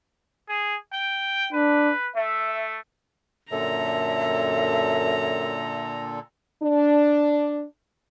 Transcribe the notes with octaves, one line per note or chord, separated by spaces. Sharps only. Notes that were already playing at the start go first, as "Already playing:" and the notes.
G#4
G5
D4 B4
A3 E5
F#2 A#2 D3 A4 E5 A#5
D4